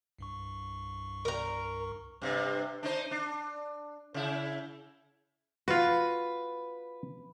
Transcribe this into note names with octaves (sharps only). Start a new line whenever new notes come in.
C2 G2 C#6
A#4 A#5
G2 C3
D4 D#4 C5
D4
C#3 E4
F4 F#4 B4